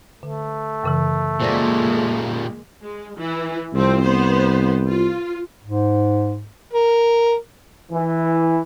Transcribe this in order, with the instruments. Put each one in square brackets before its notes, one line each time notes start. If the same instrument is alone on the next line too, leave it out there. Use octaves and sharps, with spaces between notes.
[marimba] D3 [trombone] A3
[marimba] F#2 C#3 E3
[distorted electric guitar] A#2 G3 [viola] G#3 A#3 [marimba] C5 D5 A#6
[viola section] G#3
E3
[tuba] C2 [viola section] F3 C4
[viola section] B3 C5
F4
[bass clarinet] G#2
[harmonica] A#4
[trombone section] E3